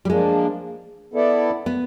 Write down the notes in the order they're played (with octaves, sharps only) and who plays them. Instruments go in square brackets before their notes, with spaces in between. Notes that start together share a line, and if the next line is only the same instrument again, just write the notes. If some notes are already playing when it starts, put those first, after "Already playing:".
[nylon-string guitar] G3
[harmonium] F3 A#3 D4 [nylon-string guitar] G#3
[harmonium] B3 E4 A4 D5
[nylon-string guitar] B3